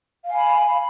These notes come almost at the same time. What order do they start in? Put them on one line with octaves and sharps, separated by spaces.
F5 G#5 B5